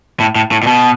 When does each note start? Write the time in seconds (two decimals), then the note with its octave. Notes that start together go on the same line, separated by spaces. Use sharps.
0.20 A2
0.36 A2
0.51 A2
0.63 A#2
0.67 B2